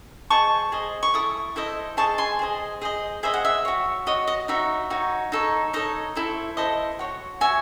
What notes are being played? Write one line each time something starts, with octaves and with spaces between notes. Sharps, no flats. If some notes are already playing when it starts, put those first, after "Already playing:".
G#4 C5 D#5 A5 C#6
G#4 C5 D#5
C#6
E4 A4 D#6
E4 A4 C5 D#5
G#4 C5 D#5 A5 C#6
G#5 C6
G#4 C5 D#5
G#4 C5 D#5
G#4 C5 D#5 E5
F#5
E5
F#4 C#5
F#4 C#5 D#5
D#5
D#4 F#4 C#5 E5
D#4 F#4 C#5
D#4 A4 C#5
D#4 A4 C#5 D#5
E4 A4 C5
E4 A4 C5 D#5
F#4 C#5
F#4 C#5 E5 G#5